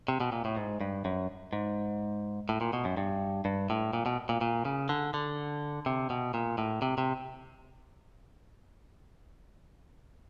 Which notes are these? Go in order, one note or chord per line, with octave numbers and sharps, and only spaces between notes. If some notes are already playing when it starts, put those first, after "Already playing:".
C3
B2
A#2
A2
G#2
G2
F#2
G#2
A2
A#2
B2
F#2
G2
G2
A2
A#2
B2
A#2
A#2
C#3
D3
D3
C3
B2
A#2
A2
C3
C3